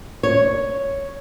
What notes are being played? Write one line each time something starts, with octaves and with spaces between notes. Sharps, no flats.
C#5